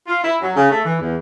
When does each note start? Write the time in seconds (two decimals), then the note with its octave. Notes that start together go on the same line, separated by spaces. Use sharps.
0.07 F4
0.22 E4
0.41 F#3
0.55 C#3
0.70 A3
0.84 E3
0.99 E2